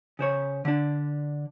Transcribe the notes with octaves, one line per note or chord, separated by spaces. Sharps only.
C#3 C5 C#5
D3 D4